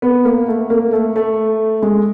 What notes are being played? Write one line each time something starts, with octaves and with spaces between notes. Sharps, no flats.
B3
A#3
A3
A#3
A3
A3
G#3